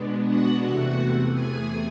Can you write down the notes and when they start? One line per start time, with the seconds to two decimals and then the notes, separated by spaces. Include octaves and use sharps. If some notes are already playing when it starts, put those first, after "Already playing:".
Already playing: B2 G#3 B3 D4
0.27 F#4 F#5
0.61 E2 C3 E3 A3 F#4 F#5
1.31 G#4 G#5